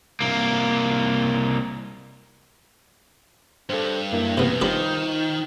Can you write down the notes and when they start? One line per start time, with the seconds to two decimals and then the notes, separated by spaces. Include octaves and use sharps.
0.21 C2 A#3
3.70 G2 A4 C5
4.12 F#2 A#3 E4
4.37 E2 C3 B3
4.61 D#3 G3 D4 F4 B4 C5